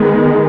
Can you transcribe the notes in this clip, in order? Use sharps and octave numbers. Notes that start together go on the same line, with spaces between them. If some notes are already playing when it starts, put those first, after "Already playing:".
Already playing: D#3 G#3 B3